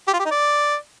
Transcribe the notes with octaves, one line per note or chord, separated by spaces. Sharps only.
G4
F4
G4
D#4
D5